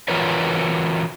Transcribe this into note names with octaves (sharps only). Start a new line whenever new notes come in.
E3 F4 F#4 A#4 B4 C#5